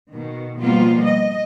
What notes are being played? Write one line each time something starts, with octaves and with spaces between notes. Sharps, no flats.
B2 D#3
B2 F3 G3 A#3 B3 F4
D#5